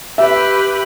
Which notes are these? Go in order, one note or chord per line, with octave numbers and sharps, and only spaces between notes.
G4 B4 E5